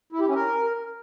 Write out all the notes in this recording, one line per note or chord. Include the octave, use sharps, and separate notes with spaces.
E4
G4
C#4
A#4